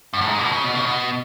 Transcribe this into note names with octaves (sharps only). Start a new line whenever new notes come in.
F#2
A2
G#2
B2
C#3
B2
C#3
B2